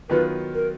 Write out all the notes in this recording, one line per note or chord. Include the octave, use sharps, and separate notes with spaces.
D#3 F#3 B3 F4 B4
A#4